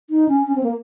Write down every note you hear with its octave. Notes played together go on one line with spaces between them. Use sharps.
D#4
C#4
C#4
C4
A#3